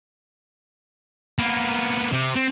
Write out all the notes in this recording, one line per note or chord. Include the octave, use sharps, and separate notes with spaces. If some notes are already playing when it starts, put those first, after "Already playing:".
A#3 B3
C3
C4